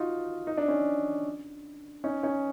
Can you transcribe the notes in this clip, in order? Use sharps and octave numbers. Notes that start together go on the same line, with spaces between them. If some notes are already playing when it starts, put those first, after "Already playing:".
Already playing: D#4 F4 F#4
D#4
D4
C#4 D#4
C#4 D#4
C#4 D#4